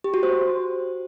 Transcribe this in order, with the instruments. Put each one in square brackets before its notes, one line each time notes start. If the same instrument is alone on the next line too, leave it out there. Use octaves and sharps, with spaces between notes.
[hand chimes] G4
F#4
C5